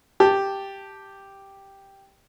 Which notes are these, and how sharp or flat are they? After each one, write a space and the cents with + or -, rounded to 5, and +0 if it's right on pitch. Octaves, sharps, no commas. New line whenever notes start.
G4 +0 A5 +0